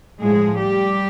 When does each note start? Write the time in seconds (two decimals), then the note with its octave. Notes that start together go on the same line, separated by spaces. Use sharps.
0.20 A2 F3 G#3 G#4
0.57 G3 G4